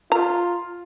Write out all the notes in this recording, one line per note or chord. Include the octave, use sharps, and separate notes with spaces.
F4 A#5